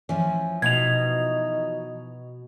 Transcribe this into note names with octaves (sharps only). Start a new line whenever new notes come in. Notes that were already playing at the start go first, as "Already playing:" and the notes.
E3 F3 C#4
B2 D#4 G#6 F7